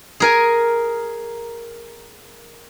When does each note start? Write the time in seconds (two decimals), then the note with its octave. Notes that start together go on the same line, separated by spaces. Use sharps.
0.20 G#4 A#4 G#5